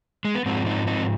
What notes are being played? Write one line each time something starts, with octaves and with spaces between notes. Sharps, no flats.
G#3
B3
G#2 F3 G#3 C4
C4 D#4
C4 D#4